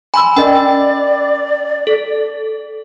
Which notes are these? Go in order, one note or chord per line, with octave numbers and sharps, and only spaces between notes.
G#5 B5 C6 E6
C#4 A#4 D5 D#5 G5
A4